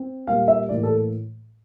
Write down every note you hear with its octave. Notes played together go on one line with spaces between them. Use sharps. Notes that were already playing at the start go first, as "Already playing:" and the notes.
Already playing: C4
A#2 G3 A#3 F5
E5
A2 E3 A#3 D5
A4